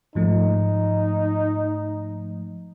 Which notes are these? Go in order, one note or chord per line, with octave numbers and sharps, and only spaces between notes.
G#2 F3 A3 D#4